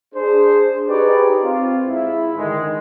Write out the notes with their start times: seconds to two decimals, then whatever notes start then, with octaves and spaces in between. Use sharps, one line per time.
0.15 D4 G#4 C5
0.88 D#4 G4 G#4 B4 C#5 D5
1.43 C4 F4
1.87 G#2 E4
2.36 D3 D#3 G#3